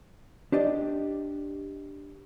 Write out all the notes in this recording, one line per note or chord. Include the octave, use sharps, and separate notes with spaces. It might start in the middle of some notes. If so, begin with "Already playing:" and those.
D4 G4 D5 D#5